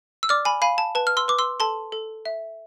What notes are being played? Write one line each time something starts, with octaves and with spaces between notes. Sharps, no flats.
E6
D5 D6 F6
G#5 B5
F5 G#5 B5
A5
B4 A5
F6
C6 E6
B4 D6
C6 E6
A4 A5 C6
A4
E5